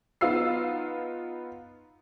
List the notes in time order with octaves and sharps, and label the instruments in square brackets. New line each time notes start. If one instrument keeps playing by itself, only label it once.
[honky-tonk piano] B3 D#4 F4 E6 C7